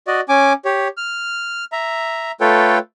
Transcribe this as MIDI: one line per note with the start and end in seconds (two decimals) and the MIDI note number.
0.07 0.21 66
0.07 0.21 74
0.07 0.21 75
0.29 0.53 61
0.29 0.53 80
0.29 0.53 86
0.65 0.88 67
0.65 0.88 73
0.97 1.65 89
1.72 2.31 76
1.72 2.31 82
2.41 2.78 57
2.41 2.78 65
2.41 2.78 69
2.41 2.78 71
2.41 2.78 73
2.41 2.78 79